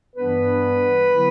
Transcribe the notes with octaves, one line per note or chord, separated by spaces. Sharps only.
G2 E3 G3 B3 D4 B4
D3 F#3 B3 E4